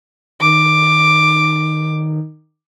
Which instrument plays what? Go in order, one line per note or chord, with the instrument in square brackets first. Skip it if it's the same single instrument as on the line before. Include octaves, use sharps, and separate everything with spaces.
[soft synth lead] D#3 [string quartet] D6